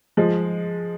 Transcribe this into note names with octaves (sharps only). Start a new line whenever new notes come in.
F3 G#3